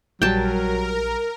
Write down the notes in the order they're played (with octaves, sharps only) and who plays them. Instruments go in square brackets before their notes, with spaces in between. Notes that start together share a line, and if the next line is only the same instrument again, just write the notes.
[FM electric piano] A#1 G3 [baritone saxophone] F#3 [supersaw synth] A#4 [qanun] G5 A5